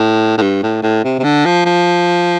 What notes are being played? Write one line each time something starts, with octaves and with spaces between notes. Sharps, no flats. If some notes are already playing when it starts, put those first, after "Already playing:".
Already playing: A2
A2
G2
A2
A2
C3
C3
D3
F3
F3